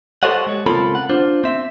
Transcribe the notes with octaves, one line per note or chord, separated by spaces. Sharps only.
G4 A4 C5 C#5 D#5 F#5
G#3 C#5
C#2 C4 F4 A4 A#4 B5
F#5
D4 F4 C5
C4 E5